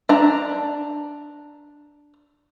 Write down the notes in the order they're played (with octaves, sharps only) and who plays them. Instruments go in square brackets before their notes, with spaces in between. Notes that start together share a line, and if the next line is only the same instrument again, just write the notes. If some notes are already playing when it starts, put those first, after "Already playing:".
[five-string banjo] D4 A#5